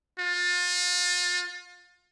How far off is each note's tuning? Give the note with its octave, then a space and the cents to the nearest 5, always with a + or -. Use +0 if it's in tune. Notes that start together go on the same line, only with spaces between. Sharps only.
F4 +30